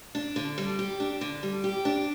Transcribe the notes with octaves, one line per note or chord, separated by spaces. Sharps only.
D4
D3
G3
G4
D4
D3
G3
G4
D4